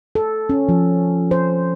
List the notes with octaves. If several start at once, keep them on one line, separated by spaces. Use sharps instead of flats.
A4
C#4
F3
C5